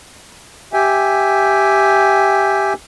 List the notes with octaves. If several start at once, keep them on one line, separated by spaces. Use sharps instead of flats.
G4 E5 G5 G#5